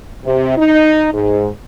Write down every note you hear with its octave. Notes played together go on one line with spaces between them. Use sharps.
C3
D#4
G#2